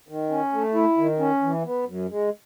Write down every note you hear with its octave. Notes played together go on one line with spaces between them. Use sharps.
D#3
C#4
A3
E4
D#3
C#4
E3
B3
F#2
G#3